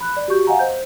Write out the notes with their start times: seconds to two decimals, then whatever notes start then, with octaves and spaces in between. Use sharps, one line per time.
0.01 B5 F#6
0.17 D5
0.28 F#4 G4 C#6 G6
0.47 D#5 F5 F#5 G#5 A#5
0.59 C5 G6